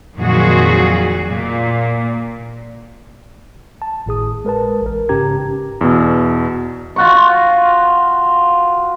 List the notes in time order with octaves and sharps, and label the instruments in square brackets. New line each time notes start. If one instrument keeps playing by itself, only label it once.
[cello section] F2 A#2 D#3 F#3 F#4 G#4
A#2
[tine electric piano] A5
G#1 A2 G#4 D#6
G#3 A#4 B4 A5
A1 A#4
G#2 C#3 C#4 G4 A#5 G#6
[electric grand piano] E2 B2
[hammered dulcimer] F4 F#4 C#6